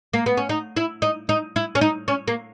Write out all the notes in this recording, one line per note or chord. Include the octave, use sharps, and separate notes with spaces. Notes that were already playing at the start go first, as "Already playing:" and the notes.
A#3
B3
C#4
D#4
E4
D#4
D#4
E4
C#4
D#4
C#4
A#3